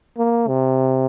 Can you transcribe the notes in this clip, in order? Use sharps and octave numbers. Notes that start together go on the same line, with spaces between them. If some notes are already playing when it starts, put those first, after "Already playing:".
A#3
C3